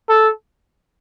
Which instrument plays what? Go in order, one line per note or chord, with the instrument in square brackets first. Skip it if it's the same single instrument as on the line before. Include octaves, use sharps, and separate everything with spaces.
[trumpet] A4